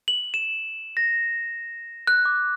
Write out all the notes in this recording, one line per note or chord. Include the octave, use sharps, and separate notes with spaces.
F#7
E7
A#6
F#6
D6